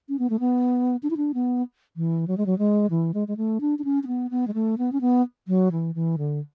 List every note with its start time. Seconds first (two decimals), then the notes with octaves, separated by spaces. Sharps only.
0.09 C#4
0.19 B3
0.30 A3
0.40 B3
1.03 D4
1.10 E4
1.17 D4
1.34 B3
1.97 E3
2.28 F#3
2.38 G#3
2.46 F#3
2.58 G#3
2.90 E3
3.14 G#3
3.28 G#3
3.37 A3
3.61 D4
3.79 D4
3.84 C#4
4.03 C#4
4.07 B3
4.31 B3
4.48 G#3
4.54 A3
4.78 B3
4.92 C#4
5.01 B3
5.48 F#3
5.72 E3
5.95 E3
6.18 D3